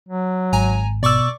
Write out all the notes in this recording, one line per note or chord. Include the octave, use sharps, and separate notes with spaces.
F#3
G#1 G#5 A#5
B2 D5 C#6 D6 E6